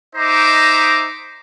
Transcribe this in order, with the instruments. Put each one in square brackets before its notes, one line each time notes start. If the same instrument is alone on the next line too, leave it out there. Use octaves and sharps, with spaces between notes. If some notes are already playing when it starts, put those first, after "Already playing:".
[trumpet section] D#4 C5 D#5 E5 A#5 D6